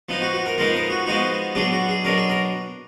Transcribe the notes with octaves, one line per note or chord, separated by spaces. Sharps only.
F3 B3 D#4
F#4
F#4
A#4
F3 G#3 B3 D#4 A#4
A#4
F#4
F3 G#3 B3 D#4 F#4
B2 F#3 D4 G#4
F#4
G#4
B2 F#3 D4 A#4
G#4
A#4